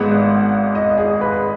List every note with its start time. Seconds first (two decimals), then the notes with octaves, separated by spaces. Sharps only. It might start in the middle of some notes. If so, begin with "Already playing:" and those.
Already playing: G#1 G#2 G#3 B3 F#5
0.75 D#5
0.98 G#4
1.21 B4